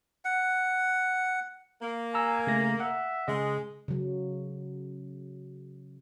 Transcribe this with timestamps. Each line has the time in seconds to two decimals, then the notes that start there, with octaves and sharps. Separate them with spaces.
0.25 F#5
1.82 A#3
2.14 G#5 A#5 E6
2.47 C#3 A3 A#6
2.80 E5 F#5
3.28 C#3 G#3 D#5
3.88 C#3 F#3